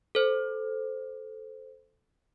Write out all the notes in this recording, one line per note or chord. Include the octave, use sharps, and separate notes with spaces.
A4 C5